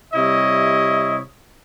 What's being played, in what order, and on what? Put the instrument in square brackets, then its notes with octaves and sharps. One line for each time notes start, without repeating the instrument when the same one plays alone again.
[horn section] C3 G3 E4 C#5 D#5